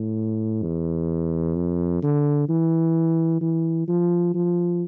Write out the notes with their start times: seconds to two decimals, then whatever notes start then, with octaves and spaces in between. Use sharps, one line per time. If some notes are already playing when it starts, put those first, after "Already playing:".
Already playing: A2
0.63 E2
1.56 F2
2.03 D3
2.49 E3
3.41 E3
3.88 F3
4.35 F3